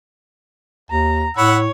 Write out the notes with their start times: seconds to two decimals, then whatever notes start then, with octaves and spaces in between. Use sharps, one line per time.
0.91 D#2 A#5
1.37 A2 C#5 F#5 B5 E6